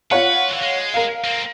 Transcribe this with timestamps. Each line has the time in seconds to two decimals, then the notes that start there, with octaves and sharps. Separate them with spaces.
0.11 F4 B4 C#5 F#5
0.49 E3 F#3
0.62 G#3
0.94 A#4 F5
1.24 A#3 C4